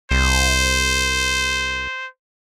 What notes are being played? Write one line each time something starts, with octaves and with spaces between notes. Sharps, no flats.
C2 C5